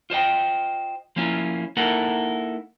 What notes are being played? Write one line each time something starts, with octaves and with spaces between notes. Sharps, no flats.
F4 C5 D#5 G5
F3 A#3 C#4 E4 F4
A#3 D#4 E4 A4 A#4 F#5